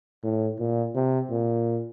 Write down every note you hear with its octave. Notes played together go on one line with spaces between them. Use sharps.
A2
A#2
C3
A#2